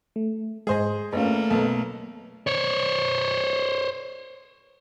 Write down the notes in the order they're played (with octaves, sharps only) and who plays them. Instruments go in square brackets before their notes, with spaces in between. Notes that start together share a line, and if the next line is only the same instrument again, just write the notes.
[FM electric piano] A3
[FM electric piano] G#2 G#3 [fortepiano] G#4 C5 D#5
[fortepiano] G#1 F4 [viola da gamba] A3 A#3 [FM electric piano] C#4 B4
[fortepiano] B1 [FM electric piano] A4 B4
[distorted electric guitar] C5 C#5